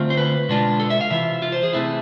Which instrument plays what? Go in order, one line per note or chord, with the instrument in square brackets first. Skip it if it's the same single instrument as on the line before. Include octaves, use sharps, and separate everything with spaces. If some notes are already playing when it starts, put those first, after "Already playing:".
Already playing: [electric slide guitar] D3 A3 C4 F4
C5
B4
B2 G#3 D4 F4
A4
E5
F5
C3 E3 F4 E5
F4
C5
G#4
C3 E3 A3 E4